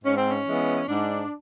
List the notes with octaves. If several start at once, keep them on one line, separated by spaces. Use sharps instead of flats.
G#2 C#4
C4
C#4
E3 G#3 B3
G#2 D4